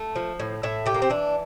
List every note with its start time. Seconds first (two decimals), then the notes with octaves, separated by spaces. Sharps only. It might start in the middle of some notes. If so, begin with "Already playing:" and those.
Already playing: A3
0.16 F3
0.40 A2
0.63 A2 E5
0.86 A3 G4
0.94 A#3
1.02 C4
1.10 E3 D4